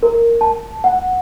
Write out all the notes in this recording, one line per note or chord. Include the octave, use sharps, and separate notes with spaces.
A#4
A5
F#5